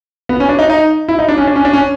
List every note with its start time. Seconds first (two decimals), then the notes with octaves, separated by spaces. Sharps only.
0.29 B3
0.40 C#4
0.49 D4
0.59 D#4
0.70 D#4
1.08 E4
1.19 D#4
1.29 D4
1.38 C#4
1.47 D4
1.56 C#4
1.65 D4
1.73 C#4